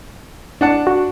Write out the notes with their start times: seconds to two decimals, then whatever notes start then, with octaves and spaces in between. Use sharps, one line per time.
0.61 D4 F#5 A5
0.87 F#4